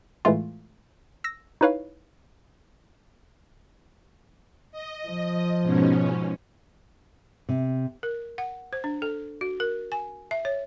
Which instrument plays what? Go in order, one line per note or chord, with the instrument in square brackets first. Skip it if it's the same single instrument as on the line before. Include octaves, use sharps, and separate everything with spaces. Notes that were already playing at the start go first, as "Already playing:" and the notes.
[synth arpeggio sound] A2 E3 G#3 A3 F4
E6 A#6
D#4 E4 B4 C#5 F5
[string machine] D#5
[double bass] F3
[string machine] G#2 B2 C#4
[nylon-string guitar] C3
[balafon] A#4
F#5
C5
D4
A4
F#4
A#4
G#5
E5
C#5